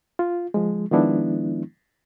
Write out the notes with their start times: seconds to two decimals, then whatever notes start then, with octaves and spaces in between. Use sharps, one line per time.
0.19 F4
0.54 F3 G#3
0.91 D#3 F3 G#3 B3 D4 E4